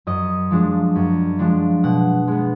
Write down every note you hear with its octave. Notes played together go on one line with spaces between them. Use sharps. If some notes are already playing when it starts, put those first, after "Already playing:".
F#2 D#5
F3 G#3 D4
F#2
F3 G#3 D4
B2 F#5
G#3 B3